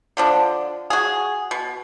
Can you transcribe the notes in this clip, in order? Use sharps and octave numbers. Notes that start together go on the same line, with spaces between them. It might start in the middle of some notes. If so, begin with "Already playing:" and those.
D3 F3 D4
F#4 G#4
B2